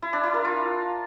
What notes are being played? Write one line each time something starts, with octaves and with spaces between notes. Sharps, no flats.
E4
D4
E4
A#4
F4